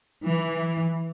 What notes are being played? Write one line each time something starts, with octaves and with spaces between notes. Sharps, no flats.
E3